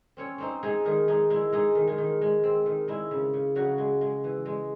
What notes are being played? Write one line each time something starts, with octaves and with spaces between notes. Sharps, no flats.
C4 C#4 C#5
C4 D#4 C5
G#3 D#4 G#4
D#3 G#3 G#4
G#3 D#4 G#4
G#3 E4
G#3 D#4 G#4
D#3
G#3 G#4
D#3
G#3
C4
D#3
G#3 E4
C#3
C#3
C#3 F#3 F#4
G#3
G#3
E3
G#3